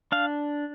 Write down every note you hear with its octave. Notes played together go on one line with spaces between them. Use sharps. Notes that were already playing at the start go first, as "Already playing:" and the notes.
D4 F5